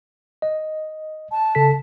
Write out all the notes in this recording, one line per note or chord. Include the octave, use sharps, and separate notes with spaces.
D#5
A5
C#3 A4 B6